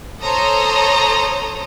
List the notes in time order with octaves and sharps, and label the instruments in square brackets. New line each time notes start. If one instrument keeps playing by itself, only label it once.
[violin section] A4 C5 C#5 A#5 D#6